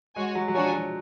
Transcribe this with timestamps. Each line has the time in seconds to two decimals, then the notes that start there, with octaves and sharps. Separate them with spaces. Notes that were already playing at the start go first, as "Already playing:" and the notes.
0.16 G#3 F#4 C#5 G#5
0.35 F#3
0.48 F#3
0.54 F3 D4 F#4 C#5 G#5
0.73 F#3